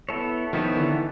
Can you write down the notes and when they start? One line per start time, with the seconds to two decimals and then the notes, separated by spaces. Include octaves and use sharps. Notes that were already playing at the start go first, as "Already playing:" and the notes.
0.09 B3 E4 A4 C#5
0.53 D#3 F3 B3 E4 A4 C#5
0.76 D3 E3
0.90 D#3